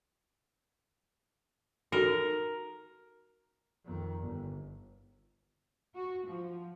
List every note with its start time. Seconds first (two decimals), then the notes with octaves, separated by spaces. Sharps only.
1.92 D#4 F#4 A4 A#4
3.85 F2 D#3
4.19 G1
5.95 F#4
6.27 F3